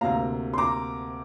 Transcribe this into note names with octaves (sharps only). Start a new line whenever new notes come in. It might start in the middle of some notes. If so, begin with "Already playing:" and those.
D2 C3 A#3 F5 A#5
C6
A#5 D6